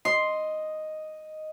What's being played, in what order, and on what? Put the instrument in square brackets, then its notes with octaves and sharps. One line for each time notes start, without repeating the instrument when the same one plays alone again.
[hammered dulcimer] D#5 [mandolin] C6